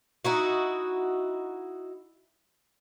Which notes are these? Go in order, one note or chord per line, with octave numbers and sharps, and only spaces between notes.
D#4 E4 F#4